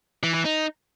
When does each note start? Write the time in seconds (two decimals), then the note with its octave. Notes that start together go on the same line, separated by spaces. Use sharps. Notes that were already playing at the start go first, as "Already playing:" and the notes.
0.23 E3
0.34 E3
0.45 D#4